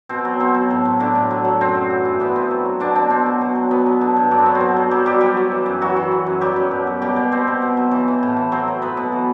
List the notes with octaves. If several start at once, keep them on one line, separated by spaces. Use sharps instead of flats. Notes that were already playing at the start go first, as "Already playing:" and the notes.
B2 C4
F#3
B2 C4
F#3
A2
A2
A2 D3 D4
A2
F#3
F#3
F#2 C4
F#2
E3
G2
E3 B3
G2 C4
F#3
F#3
B2 D3 D4
B2 C4
B2 C4
F#3
B2
F#3
F#3 B3
F#3
D3
G2
F#3 D4
C4
F#3 B3
C4
B2
F#3
F#3 G3 G4
F#3 G3 G4
F#3 G3 G4
F#3
E3
F#2
E3 F#3 F#4
E3
F#3
F#2
F#3 G3 G4
F#2
B2
F#3
B2 G3 G4
B2
B2 C4 C5
B2
B2
F#3
E3
E3
A2
E3
F#3 C4 C5
F#3
F#3 B3 B4
B2
E3